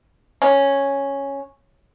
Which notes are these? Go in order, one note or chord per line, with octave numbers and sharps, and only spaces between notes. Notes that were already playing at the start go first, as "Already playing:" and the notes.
C#4